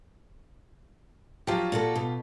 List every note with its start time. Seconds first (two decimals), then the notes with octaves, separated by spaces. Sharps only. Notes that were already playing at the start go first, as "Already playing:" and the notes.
1.47 F3 F#3 F4 G4
1.72 A#2 F#4 A4
1.95 B2